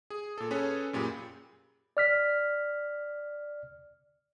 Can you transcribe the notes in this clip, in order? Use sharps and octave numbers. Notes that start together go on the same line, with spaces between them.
G#4
A#2 A4
C#4 G#4 A4 B4 C#5 G#5
F#2 A#2 G4 G#4 B5
D5 F6 B6